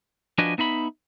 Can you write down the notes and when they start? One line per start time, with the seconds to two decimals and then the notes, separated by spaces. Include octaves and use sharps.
0.38 F3 D4 F#4 B4 D#5 G#5
0.58 B3 D#4 E5 B5